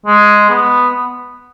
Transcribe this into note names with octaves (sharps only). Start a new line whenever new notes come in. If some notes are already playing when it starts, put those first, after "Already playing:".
G#3
B3